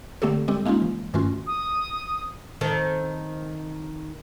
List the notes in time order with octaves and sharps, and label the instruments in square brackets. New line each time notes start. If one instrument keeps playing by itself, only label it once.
[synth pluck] D3 A3 C4 G4 A4
G3 G#3 C4 G4 A4
G#3 A#3 C#4 D#4 F4
E3
G2 D#3 A3 C#4 F4 F#4
[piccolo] D#6
[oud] D#3 C4 A4